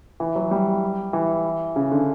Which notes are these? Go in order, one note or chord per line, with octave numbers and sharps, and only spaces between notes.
E3
F#3
G3
E3
C#3
D3